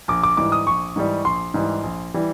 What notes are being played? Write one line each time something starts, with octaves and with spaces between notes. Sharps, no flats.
A#1 D6
D6
G#2 E3 G3 D6
D#6
A#1 C#6
G#2 E3 G3
A#1 C6
G#2 E3 G3
A#1
E3 G3